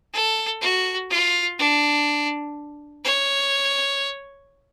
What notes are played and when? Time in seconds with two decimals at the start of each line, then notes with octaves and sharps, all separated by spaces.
0.14 A4
0.61 F#4
1.10 F4
1.59 D4
3.04 C#5